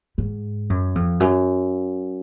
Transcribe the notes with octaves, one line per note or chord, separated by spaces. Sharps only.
G#2
F#2
F2
F#2